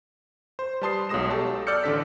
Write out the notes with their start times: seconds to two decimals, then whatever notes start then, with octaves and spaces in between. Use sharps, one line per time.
0.59 C5
0.81 G3 B4 A5 C6 D#6 C7
1.09 B1 F#3 G#3 D#6 A#6 E7
1.30 G4 A4 A5 C#6
1.67 D5 E6 F6 G6 C#7
1.84 A1 D3 D4 A4 B6